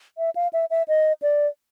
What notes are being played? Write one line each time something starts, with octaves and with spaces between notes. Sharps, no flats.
E5
F5
E5
E5
D#5
D5